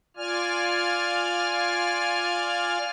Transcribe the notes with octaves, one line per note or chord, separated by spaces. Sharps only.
F4 D5 G#5 F6